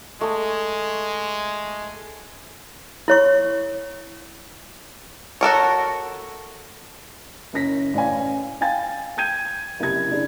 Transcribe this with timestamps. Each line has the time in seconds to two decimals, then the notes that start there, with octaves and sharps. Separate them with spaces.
0.21 G#3 A3 D#6
3.08 E4 C#5 C#6
5.41 F#4 A4 A#4 C#5
7.53 F#1 F#2 C#4 A#6 B6
7.93 A1 C#4 D5 F5 G#5
8.61 F5 G5 G#5 A6
9.17 G5 G6 G#6 D#7
9.80 F#1 C2 E4 G4 G#6
10.11 D4 E4 G#4